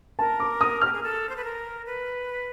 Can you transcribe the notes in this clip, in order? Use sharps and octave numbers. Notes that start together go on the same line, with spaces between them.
A#4 A5
D6
D#6
G4 F6
G#4
A4
C5
B4
A#4
B4